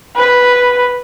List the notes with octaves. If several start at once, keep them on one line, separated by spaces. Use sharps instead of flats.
B4